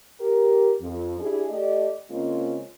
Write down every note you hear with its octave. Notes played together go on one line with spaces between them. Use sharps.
G4 A#4
F2
D4 E4 G4 G#4
A3 G4 D5 D#5
C#3 G#3 A#3 C4 C#4 F4